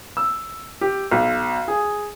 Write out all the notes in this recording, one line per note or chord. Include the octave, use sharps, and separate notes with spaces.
E6
G4
B1
G#4